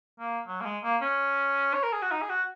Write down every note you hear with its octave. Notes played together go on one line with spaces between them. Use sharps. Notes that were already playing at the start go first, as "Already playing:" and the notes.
A#3
F#3
A#3
G#3
A#3
C#4
C#5
A#4
G#4
F#4
D#4
G#4
F#4